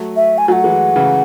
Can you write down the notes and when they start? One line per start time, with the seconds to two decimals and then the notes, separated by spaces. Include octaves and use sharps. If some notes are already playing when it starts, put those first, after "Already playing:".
Already playing: F#3 A3
0.16 E5
0.38 G#5
0.48 F#3 A3 F#5 G#5
0.64 E3 G#3
0.96 C#3 E3